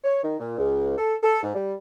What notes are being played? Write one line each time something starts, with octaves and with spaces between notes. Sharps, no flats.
C#5
D#3
A#2
C#2
A4
A4
G#2
G3